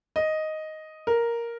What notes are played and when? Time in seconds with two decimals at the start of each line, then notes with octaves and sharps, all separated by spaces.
0.16 D#5
1.07 A#4